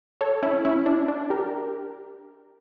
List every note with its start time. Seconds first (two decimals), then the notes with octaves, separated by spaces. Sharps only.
0.21 A4 C#5
0.43 C#4 E4
0.65 C#4 E4
0.86 D4
1.08 D4
1.30 G4 A#4